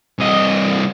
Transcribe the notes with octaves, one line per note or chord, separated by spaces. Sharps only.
C2 D#5